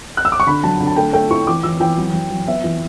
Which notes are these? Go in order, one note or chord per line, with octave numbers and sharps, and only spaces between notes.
F#6
E6
D6
C#6
D3 B5
F#3 A5
D3
A5
A3 G5
A3 G5
E4 C#6
E3 D6
E3 E6
E3 G5
F#3
F#3
F#3
B3 E5
E3